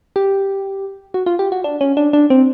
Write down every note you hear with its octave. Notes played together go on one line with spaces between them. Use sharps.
G4
F#4
F4
G4
F#4
D4
C#4
D4
D4
C4